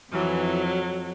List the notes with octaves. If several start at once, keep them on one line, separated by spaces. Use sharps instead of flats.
F2 E3 F#3